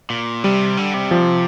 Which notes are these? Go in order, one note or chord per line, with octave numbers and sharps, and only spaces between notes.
A#2
C3 G3
D3
C3
F3